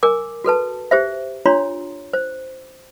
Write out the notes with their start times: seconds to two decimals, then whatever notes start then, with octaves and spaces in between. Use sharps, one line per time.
0.03 A#4 G#5 D6
0.44 F#4 A4 B4 A5
0.91 G4 C5 E5
1.45 D4 F4 C#5 A#5 C6
2.13 C5